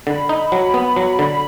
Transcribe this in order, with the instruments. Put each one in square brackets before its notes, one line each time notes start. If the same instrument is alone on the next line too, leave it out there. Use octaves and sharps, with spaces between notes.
[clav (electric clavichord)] D3 [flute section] B5
[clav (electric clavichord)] D#4
F#3
B3
F#3
D3